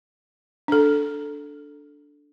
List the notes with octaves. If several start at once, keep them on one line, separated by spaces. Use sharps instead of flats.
D4 A4